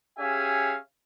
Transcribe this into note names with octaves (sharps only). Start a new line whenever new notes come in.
C#4 G4 G#4 E5 F5 G#5